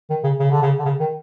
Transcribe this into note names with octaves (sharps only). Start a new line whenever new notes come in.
D#3
C#3
C#3
D3
C#3
D3
C#3
D#3